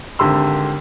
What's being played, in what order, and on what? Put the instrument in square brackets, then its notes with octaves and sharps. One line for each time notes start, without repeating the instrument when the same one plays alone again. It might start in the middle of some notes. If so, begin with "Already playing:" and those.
[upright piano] G#1 D3 G4 C6 E6